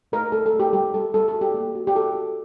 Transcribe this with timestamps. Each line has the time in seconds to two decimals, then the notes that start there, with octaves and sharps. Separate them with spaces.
0.12 A3 A#4
0.32 A3 A4
0.46 A4
0.54 A3
0.60 G4
0.73 G3 G4
0.94 G3 A4
1.14 G3 A4
1.28 A4
1.34 F#4
1.41 G4
1.54 A#3
1.75 F#4
1.87 G4
1.95 F#4 A4
2.15 F#4